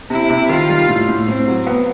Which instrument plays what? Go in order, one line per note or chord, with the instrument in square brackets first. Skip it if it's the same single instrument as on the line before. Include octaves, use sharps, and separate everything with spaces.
[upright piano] C3 [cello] E4
[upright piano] C3
[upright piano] D#3 [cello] F4
[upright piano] G3
A2
A2
[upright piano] A2 [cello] C4
[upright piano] F#3
B3